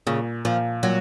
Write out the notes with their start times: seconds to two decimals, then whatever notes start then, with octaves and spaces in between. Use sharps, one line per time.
0.07 A#2 C#3
0.45 A#2 F3
0.83 A#2 F#3